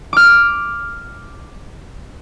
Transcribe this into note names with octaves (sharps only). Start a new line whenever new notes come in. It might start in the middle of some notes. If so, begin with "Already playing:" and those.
D6 F6